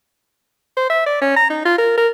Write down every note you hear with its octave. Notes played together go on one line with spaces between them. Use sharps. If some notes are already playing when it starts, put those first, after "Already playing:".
C5
E5
D5
C#4
A#5
D#4
F4
A#4
A#4